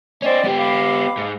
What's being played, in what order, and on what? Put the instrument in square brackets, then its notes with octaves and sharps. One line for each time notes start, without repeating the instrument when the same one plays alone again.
[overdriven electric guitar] C#4 C5 [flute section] D5 D#5 G5
[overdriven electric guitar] B3 G4
[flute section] F5 B5 D6
[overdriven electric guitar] G#2